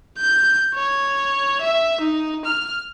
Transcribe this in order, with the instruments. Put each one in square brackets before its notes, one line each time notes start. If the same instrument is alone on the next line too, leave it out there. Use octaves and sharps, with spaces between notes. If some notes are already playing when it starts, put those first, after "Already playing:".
[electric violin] G6
C#5
E5
D#4
F6